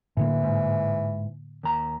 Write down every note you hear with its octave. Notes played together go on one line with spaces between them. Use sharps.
A2 D3 E3 A#3
G#2
D#2 A#5